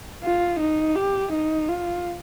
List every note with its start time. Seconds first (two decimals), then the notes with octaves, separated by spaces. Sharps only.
0.24 F4
0.60 D#4
0.96 G4
1.33 D#4
1.69 F4